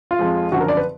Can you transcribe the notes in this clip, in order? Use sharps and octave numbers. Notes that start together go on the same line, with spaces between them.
F4
F2 F3 G#3
G#1 F#2 D3 F3 F#4
A#4
D5
B4